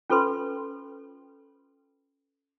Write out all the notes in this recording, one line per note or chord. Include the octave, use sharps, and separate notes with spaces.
C#4 F4 A4 B4 C6